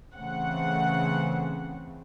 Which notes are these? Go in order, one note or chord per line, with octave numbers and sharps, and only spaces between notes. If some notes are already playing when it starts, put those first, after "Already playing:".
C#3 E3 A3 C4 F#5